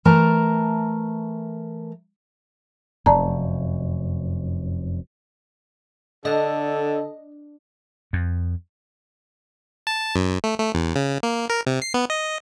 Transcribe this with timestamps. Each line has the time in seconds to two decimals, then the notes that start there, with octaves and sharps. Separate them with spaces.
0.05 E3 A3 A#4 A5 A#5
3.06 F1 F#2 D5 A5 A#5
6.25 D3 D4 A4 D#5
8.13 F2
9.87 A5
10.16 F#2
10.44 A3
10.59 A3
10.75 E2
10.96 C#3
11.23 A#3
11.50 A#4
11.67 C3
11.82 C7
11.94 B3
12.10 D#5